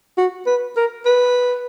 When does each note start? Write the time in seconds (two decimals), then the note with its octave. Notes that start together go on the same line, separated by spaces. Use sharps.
0.18 F#4
0.46 B4
0.77 A#4
1.06 B4